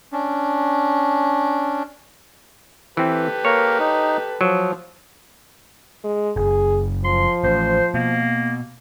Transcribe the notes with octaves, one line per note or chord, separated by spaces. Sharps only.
C#4 D4
E3 C4 G4 A4 B4
A#3 A#4 C#5
D#4
F3 F#3
G#3
F#1 G#4
F3 C6
A1 C5
B2 A#3